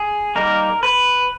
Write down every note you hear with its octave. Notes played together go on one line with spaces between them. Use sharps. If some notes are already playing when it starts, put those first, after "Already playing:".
Already playing: G#4
G3 A#3 D#4 A#4
B4